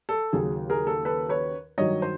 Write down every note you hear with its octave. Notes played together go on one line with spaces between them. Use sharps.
A4
D#2 C#3 F#3 G#4
G#4 A#4
A4
A4 B4
B4 C#5
G2 D#3 F#3 C#5 D#5
C5